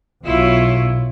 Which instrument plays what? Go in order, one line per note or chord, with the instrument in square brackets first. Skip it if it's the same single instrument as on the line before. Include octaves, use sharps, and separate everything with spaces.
[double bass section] B1 [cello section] E4 F4 C#5